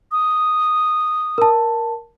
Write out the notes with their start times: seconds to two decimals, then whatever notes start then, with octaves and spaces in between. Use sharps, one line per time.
0.12 D#6
1.38 A#4 A5